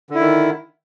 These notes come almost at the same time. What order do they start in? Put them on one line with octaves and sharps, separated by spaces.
D3 E4 D#3